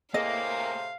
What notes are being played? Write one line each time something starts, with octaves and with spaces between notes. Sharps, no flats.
A2 C3 A#3 G#4 D#5 F5